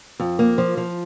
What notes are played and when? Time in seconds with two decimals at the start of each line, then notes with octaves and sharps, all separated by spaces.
0.20 F2
0.39 A#3
0.58 F3
0.77 F3